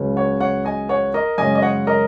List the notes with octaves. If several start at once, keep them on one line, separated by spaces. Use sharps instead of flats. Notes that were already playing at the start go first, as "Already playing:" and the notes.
Already playing: C#2 C#3 F#3 C#4
C#5 F#5
C#5 F#5
D#5 G#5
C#5 F#5
A#4 D#5
F#2 C#3 G#3 C#4 D#5 G#5
D#5
C#5 F#5
A#4 D#5